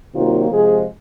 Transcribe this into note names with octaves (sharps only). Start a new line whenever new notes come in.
C3 D#3 F#3 A#3 F4
C3 F3 G#3 G#4